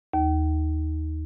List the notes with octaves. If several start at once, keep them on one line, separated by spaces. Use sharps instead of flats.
D#2